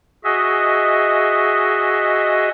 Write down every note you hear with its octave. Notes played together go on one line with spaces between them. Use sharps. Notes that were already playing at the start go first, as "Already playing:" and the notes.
F#4 G#4 D#5 E5